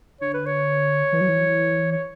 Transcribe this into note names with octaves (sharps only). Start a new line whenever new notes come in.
D3 C#5
B4
C#5
E3
F#3
E3
C#5